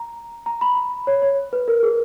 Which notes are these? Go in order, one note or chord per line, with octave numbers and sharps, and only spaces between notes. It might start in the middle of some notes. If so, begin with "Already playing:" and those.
Already playing: A#5
A#5
B5
B5
C#5
C#5
B4
A#4
G#4